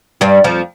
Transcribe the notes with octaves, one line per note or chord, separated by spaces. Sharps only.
G2 G3
F2 F3